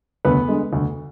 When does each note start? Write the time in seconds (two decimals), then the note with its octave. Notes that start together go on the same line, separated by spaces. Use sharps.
0.25 D2 B3 B4
0.48 D3 G#3
0.73 D2